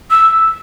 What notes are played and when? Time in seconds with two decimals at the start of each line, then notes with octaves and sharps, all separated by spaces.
0.11 E6